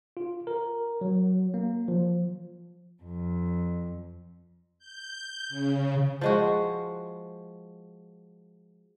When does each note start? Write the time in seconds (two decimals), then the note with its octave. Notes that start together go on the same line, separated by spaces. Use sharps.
0.17 F4
0.47 A#4
1.01 F#3
1.54 A#3
1.88 F3
3.03 F2
4.79 G6
5.49 C#3
6.21 F3 G#3 F#4